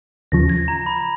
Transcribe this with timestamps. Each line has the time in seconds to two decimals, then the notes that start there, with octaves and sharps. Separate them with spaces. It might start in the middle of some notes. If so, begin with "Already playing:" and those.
0.32 D#2 C#3 F3 A#6
0.50 G#6
0.68 A#5
0.86 B5